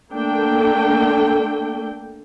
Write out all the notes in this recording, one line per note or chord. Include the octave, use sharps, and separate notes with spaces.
D3 A3 A#3 D4 G5